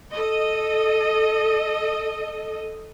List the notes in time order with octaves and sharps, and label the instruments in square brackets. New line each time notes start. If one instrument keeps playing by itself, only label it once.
[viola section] A4 D#5